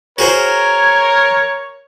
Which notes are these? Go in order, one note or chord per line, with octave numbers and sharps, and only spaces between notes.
F#4 G#4 A#4 C5 C#5 G#6